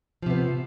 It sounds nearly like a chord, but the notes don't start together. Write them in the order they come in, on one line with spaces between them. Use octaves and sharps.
F3 C3 B3